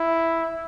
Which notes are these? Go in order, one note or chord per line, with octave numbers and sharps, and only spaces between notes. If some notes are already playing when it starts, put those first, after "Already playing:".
Already playing: E4